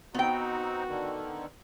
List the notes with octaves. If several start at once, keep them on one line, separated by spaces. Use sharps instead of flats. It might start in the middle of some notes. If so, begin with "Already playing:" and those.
B3 C4 D#4 F#4 G5
D3 D#3